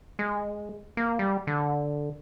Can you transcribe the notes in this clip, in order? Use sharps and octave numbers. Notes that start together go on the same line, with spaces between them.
G#3
A#3
G3
D3